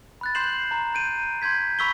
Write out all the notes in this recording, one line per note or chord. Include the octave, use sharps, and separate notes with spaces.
B5 F#6 A6
C6 G6 C7 E7 F#7
A#5
G6 D7 D#7
C6 G6 G#6 B6
B5 C#6 E6 B6 G7